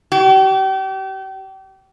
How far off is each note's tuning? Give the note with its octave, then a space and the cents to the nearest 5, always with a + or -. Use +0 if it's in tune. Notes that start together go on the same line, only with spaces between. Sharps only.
G4 -35